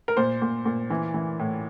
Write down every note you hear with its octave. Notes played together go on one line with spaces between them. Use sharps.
A#4
A#2 C5
A#2
A#2
E3
E3
A2